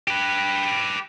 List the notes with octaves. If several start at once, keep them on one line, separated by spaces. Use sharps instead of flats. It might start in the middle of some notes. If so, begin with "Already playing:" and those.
G4 B4